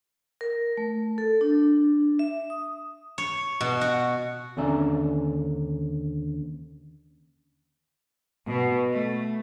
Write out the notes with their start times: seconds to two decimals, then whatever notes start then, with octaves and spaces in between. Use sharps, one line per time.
0.41 A#4
0.77 A3
1.18 A4
1.41 D4
2.19 E5
2.50 D#6
3.18 C#5
3.61 B2
3.81 F#4
4.57 D#2 D3 C#4 D5 E5 A#5
8.47 B2
8.92 A3